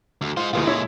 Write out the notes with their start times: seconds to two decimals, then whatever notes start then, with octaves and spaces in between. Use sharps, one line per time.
0.21 D2
0.37 G#3 F4 C5
0.53 D2 A#2 E3 G#3 F4
0.67 E4 C#5